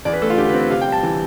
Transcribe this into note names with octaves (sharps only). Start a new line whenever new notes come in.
E2 D5
B4
A3 A4
F4
D3 G4
B4
C4
B4
C3 F5
G5
G3 A5
E3